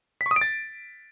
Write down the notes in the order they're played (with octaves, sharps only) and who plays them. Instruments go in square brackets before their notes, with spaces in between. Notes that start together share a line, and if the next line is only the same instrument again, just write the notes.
[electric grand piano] B6
C#6
D#6
D7
A6